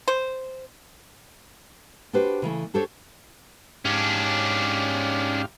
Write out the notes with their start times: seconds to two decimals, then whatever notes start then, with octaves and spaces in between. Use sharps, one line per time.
0.08 C5
2.13 D4 F#4 G4 B4 C5
2.42 C#3 E3 A3
2.74 D4 G4 A4 C5 C#5
3.85 G#2 C#4 D4 G4 F5